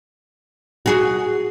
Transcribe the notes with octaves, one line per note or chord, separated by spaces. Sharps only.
F#4 G#4